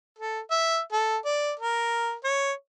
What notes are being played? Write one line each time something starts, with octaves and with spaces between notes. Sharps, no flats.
A4
E5
A4
D5
A#4
C#5